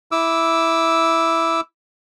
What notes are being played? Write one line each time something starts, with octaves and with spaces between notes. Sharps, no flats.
E4 D6 E6